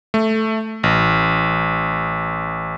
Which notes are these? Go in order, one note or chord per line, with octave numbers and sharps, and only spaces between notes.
A3
A1